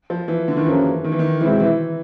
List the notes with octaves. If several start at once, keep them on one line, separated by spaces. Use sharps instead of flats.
F3
E3
D3
D#3
F#2 C#3 E3 F3 A#3
D#3
E3
D#3
B2 E3 G#3 C4 E4
E3